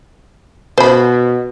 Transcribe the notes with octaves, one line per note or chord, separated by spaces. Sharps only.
B2 C5 B5